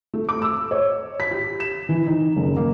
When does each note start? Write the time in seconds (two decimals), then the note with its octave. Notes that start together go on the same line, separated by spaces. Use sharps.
0.14 A3
0.29 D6
0.42 E6
0.71 C#5
1.20 B6
1.31 G4
1.60 E7
1.89 E3
2.06 D#4
2.36 F#1
2.57 A#3